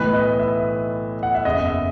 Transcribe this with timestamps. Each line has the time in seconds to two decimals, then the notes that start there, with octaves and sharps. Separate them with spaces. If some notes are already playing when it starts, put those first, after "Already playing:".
Already playing: B1 A2 E3 B4
0.13 D#5
0.39 E5
1.23 F#5
1.34 E5
1.45 F#1 E2 C#3 D#5
1.65 E5